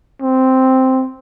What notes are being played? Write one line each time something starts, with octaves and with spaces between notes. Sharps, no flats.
C4